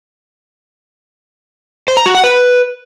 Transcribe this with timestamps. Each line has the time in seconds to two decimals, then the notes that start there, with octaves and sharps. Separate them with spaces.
1.88 C5
1.97 A#5
2.06 F#4
2.15 F#5
2.24 B4